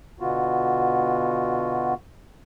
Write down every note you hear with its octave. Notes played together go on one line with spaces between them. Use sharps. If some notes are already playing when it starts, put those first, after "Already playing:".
B2 D3 B3 F4 F#4